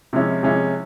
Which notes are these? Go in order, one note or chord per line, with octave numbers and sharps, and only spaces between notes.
C3 F3 G#3 C#4 E4
C3 F3 G#3 C#4 E4